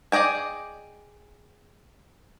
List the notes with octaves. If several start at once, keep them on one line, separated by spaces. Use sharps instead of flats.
G#4 D5 D#5 G5 G#5